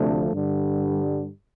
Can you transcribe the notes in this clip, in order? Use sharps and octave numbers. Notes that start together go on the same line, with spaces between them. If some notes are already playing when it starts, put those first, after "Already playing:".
Already playing: D2 C3 F3 A3 D4
G2 D3 G3